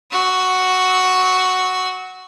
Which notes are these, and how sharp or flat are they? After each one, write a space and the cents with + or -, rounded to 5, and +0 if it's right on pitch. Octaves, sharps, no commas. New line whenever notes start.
F#4 +0 E6 -35